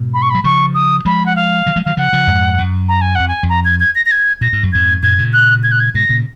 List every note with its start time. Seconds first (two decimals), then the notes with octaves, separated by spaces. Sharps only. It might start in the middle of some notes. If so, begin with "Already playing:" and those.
Already playing: G#2 B2
0.14 B5
0.22 C#6
0.30 F#3 B5
0.44 C#3 F3 C#6
0.74 D#6
1.05 F3 G#3 B5
1.26 F#5
1.36 F5
1.66 D#3 F#3
1.76 F3 G#3
1.85 D#3 F#3 F5
1.97 C#3 F3 F#5
2.13 C#3 F3
2.27 F2 G#2
2.58 F#2
2.89 A#5
3.01 G#5
3.15 F2 F#5
3.28 G#5
3.43 F2
3.49 A#5
3.65 G#6
3.80 G#6
3.95 A#6
4.06 A#6
4.11 G#6
4.41 A#2 A#6
4.53 G#2
4.63 F#2
4.72 F2 G#2 G#6
5.02 F#2 A#2 G#6
5.18 A#2 C#3
5.33 F#6
5.63 G#6
5.72 F#6
5.80 G#6
5.94 G#2 B2 A#6
6.09 A#2 C#3